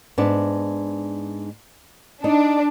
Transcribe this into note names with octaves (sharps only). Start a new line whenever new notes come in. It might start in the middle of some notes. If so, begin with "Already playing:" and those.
G#2 B3 D4
D4 D#4